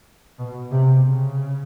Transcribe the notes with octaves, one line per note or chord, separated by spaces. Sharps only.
B2
C3
C#3